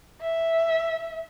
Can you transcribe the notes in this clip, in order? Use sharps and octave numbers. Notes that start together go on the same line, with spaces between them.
E5